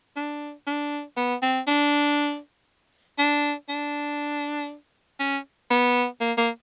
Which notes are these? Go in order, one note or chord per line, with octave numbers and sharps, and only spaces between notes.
D4
D4
B3
C4
D4
D4
D4
C#4
B3
A#3
A#3